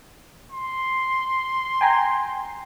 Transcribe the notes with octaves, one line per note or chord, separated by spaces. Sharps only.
C6
G5 G#5 A#5